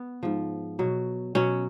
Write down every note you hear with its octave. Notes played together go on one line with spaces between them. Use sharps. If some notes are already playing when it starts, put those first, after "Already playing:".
Already playing: B3
G#2 F3
B2 F#3
B2 F#3 C#4